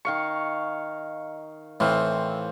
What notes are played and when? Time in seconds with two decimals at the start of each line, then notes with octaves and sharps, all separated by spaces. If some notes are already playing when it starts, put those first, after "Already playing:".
0.05 D#3 F5 C#6
1.80 A2 E3 C4 C5 F5